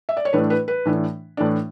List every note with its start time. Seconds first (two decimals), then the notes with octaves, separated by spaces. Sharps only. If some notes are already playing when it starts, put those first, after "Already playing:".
0.09 E5
0.17 D5
0.25 C#5
0.33 A2 E3 A3 D4 B4
0.50 B4
0.68 B4
0.85 A2 E3 A3 D4
1.37 A2 E3 A3 D4 D5